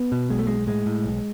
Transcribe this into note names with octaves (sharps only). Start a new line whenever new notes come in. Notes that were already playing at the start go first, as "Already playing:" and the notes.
Already playing: B3
B2
B1 G#3
A3
B1 G#3
A2 G#3
A2
B1